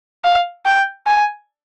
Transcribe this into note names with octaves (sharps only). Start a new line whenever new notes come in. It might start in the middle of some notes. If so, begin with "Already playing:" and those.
F5
G5
G#5